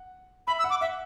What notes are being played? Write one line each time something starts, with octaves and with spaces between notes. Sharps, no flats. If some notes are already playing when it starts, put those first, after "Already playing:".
Already playing: F#5
E5 B5
E6
F#5
D6
E5 F#5